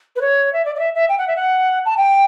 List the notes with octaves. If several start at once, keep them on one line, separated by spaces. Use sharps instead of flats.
B4
C#5
E5
D5
D5
E5
E5
G5
F#5
E5
F#5
A5
G5